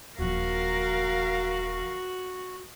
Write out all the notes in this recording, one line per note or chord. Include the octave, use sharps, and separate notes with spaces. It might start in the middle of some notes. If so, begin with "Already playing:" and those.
D#1 F3 F#4 A#4 F5